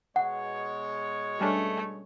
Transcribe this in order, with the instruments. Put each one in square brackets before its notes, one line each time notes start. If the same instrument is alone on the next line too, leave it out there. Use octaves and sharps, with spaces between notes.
[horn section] B2 G#3 C#5 [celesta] F#5
[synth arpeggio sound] G3 C#4 D4 [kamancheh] A3